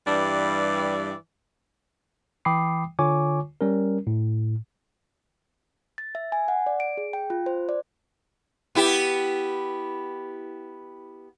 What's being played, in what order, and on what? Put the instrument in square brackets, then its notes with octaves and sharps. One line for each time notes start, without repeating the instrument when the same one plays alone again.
[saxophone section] G2 E3 G3 D5
[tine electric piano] E3 G5 B5 D6 D#6 C7
D3 F4 C#5 G#5 C#6 D6
G3 C#4 A#4
A2
[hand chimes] A6
E5
G#5
F#5
D5
D7
G#4
G5
F4
C5
D5
[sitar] B3 E4 G4